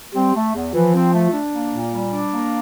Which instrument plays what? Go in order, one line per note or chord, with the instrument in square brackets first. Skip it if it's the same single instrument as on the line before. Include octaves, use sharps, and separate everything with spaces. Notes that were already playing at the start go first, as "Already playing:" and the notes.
[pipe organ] G3 [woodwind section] C4
[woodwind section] A3
E2
[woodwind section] E3 [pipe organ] F3
[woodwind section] C4
A3
D4
A#3
A#2
G3
D4
A#3